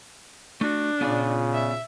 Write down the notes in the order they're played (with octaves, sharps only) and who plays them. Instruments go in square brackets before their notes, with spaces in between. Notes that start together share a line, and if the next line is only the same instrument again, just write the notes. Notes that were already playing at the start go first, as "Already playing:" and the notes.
[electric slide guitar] A3 F#4 [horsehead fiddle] D4
[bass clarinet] A#2 [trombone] C#3 [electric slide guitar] B3 F4 D5
[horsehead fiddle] E5